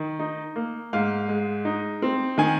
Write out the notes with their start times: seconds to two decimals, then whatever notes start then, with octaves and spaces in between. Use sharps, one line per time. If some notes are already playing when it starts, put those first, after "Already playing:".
Already playing: D#3
0.19 D#4
0.56 A#3
0.93 G#2 F5
1.29 G#3
1.65 D#4
2.02 C4
2.38 D#3 G#5